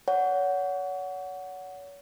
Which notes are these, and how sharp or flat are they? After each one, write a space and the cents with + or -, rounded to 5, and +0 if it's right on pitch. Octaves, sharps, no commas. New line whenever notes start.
C#5 +35 F#5 +0